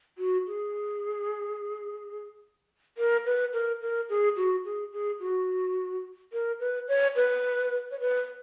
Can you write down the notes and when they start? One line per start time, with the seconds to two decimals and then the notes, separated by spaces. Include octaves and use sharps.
0.18 F#4
0.47 G#4
2.98 A#4
3.26 B4
3.53 A#4
3.81 A#4
4.09 G#4
4.37 F#4
4.65 G#4
4.92 G#4
5.20 F#4
6.33 A#4
6.60 B4
6.88 C#5
7.16 B4
7.91 C#5
8.00 B4